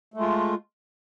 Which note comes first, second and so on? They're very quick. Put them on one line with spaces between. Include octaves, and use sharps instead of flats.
A3 G#3 F4